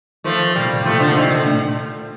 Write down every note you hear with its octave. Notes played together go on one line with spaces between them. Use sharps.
D#3 F3 A3
A#2 G3 A#3
C3
A2
A#2 F3 A3
D3 F3
C3 D#3
D3
D3 A3